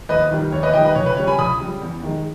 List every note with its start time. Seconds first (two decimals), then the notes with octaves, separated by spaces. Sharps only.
0.09 D#2 B4 D#5
0.31 D#3 G3
0.52 D#2 C#5
0.63 B4 D#5
0.73 D#3 G3 D#5 G5
0.85 B4 D#5
0.95 C#2 C#5
1.06 B4
1.17 C#3 G3 C#5
1.27 G#5 B5
1.39 C#2 B5 D#6
1.60 C#3 G3
1.82 E2
2.03 D#3 G#3